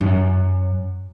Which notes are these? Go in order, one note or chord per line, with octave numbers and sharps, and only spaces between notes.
F#2